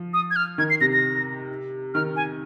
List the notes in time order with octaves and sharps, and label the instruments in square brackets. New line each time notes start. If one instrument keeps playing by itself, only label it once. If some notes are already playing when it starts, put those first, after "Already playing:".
Already playing: [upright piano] F3
[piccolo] D#6
G#6
F6
[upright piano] D#3 [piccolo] G#6
[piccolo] C7
[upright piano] C3 [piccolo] A#6
[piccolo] A#6
[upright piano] D#3 [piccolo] F6
[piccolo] G#5